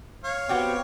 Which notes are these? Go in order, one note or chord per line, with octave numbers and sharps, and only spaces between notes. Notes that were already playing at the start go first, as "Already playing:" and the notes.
C#5 F5
B3 C4 F#4 G4 G5